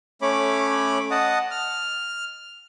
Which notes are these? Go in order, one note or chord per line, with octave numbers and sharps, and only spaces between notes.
A3 C#4 C#5 B5 D6
D#5 F#5 A5 D#6
F6